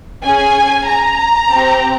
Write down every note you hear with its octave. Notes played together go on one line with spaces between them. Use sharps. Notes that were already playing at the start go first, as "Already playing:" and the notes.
C#4 G#4 G#5
A#5
C4 G4